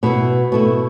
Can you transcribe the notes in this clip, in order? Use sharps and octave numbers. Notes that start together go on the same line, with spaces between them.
B2 B3 E4
B2 A3 E4